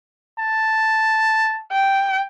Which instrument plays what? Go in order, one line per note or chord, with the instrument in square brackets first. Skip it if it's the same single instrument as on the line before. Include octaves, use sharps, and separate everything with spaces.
[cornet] A5
[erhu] G5